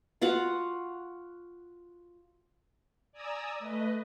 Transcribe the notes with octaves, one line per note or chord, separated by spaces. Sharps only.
F4 F#4 F5 F#5
D5 G#5 A#5 D#6 E6
A3 B4 D#5